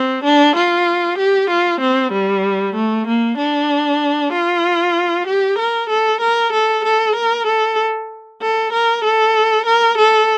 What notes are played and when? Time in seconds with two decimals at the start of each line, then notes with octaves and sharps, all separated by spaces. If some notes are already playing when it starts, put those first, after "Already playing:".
Already playing: C4
0.24 D4
0.56 F4
1.18 G4
1.50 F4
1.81 C4
2.12 G3
2.75 A3
3.07 A#3
3.38 D4
4.33 F4
5.27 G4
5.58 A#4
5.89 A4
6.21 A#4
6.52 A4
6.84 A4
7.16 A#4
7.47 A4
8.41 A4
8.73 A#4
9.04 A4
9.66 A#4
9.98 A4